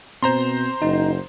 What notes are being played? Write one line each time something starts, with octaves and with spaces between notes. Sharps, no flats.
B2 C4 C5 A#5 C6
F#1 D#4